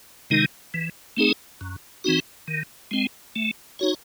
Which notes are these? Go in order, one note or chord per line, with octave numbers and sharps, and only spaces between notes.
C3 D#3 G#3 D#4
E3
A3 C4 D#4 G#4
F#2
E3 C4 D#4 F#4
D#3
G#3 C4
A3
D#4 F#4 C#5